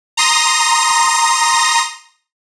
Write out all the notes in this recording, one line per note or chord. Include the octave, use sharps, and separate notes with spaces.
A#5 C6 D#6 A#6